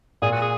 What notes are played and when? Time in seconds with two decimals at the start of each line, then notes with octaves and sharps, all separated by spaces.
0.22 A#2 G#4
0.32 F#4
0.42 G#4